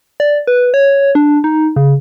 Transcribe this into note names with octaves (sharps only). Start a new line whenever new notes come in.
D5
B4
C#5
D4
D#4
C#3